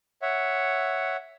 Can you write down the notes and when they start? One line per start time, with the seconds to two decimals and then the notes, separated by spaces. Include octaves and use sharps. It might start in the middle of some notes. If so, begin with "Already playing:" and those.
0.22 C#5 E5 F#5